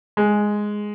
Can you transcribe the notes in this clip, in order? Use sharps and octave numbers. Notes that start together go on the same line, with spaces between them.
G#3